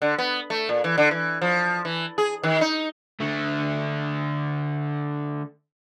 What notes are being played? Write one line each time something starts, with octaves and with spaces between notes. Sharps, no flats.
D3
B3
A3
A#2
E3
D3
E3
F3
E3
G#4
D#3
D#4
D3 A3